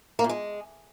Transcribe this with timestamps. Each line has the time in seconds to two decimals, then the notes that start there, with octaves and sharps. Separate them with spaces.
0.19 A#3
0.24 A#2
0.29 G#3